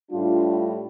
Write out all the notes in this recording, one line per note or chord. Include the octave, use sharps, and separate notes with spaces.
A2 G3 D4 F4